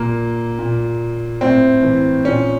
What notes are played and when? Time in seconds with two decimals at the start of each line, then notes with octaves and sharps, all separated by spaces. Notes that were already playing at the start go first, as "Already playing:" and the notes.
Already playing: A#2 A#3
0.59 A#2
1.41 A2 C4
1.83 E3
2.25 A#2 C#4